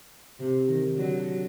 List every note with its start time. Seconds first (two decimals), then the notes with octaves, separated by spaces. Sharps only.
0.39 C3
0.68 D#3
0.96 D3 F#3